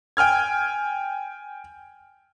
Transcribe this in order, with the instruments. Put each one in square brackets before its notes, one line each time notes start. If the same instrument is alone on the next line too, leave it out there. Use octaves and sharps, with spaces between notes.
[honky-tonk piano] G5 G#5 F6 G#6